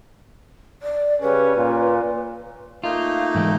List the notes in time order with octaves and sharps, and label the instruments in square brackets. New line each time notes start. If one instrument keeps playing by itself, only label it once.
[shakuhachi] D5
[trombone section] C#3 G3 C#4 [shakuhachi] B4
[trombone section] A#2
[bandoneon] A3 A#3 D#4 [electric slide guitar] F4
[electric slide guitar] G#2 E3 D#5